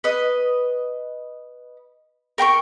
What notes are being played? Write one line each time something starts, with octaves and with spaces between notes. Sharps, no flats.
B4 D#5
A#4 G5 B5 C#6